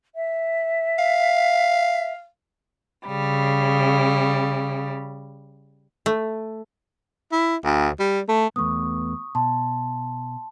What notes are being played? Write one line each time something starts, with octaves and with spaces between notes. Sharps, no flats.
E5
F5
C#3 G3
A3
E4
D2
G3
A3
E2 A3 B3 C#6 D#6
B2 A5 C6